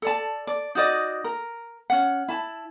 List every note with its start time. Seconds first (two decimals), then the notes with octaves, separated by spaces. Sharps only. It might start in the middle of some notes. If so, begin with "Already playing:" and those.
0.02 A4 D5 A5
0.47 D5
0.75 D#4 F#4 D5 D#5
1.24 A#4
1.90 C#4 F#5
2.28 E4 A5